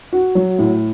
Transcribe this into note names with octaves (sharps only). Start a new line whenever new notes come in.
F#4
F#3
A2